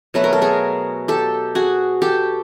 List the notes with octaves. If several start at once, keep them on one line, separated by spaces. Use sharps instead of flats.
B2 F#3 A3 B4
A#4
A4
G#4 A#4
G4 A4
F#4 G#4
G4 A4